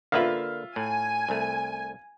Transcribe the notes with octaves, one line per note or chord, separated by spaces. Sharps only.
D3 A#3 F4 B4 E5 F5
A2 G#5
C2 A3